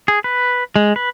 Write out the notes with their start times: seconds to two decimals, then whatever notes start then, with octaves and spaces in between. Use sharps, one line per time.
0.08 G#4
0.24 B4
0.76 G#3
0.96 B4